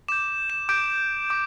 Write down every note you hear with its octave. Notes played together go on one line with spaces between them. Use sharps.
D6 G6 E7
E7
D6 G6 D7
D6